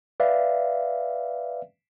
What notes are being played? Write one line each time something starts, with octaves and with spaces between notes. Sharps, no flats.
B4 D5 E5 F5